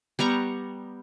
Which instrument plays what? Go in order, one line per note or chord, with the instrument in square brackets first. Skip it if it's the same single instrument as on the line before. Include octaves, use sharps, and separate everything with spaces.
[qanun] G3 B3 A#5 C#6